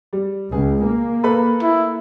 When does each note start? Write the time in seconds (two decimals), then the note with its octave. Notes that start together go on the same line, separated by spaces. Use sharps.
0.13 G3
0.52 C#2 G#4
0.84 A#3
1.23 A4 B4 B5
1.62 E4